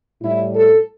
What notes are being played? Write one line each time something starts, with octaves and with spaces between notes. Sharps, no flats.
A2 G3 E4
A4